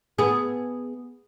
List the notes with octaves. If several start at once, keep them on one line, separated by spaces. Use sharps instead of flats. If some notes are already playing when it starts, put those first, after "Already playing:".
B3 G#4